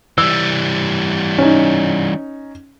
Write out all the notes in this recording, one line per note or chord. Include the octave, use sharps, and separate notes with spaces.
E3 G3 E6
C#4 D#4